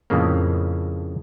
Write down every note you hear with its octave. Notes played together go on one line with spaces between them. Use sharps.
F2 A2 C#3 A#3